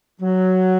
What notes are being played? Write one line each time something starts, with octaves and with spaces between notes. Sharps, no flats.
F#3